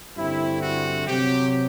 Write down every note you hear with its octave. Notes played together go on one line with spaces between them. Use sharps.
G2 D3 A3 C4 E4
F#4
C3 F#3 C4 G4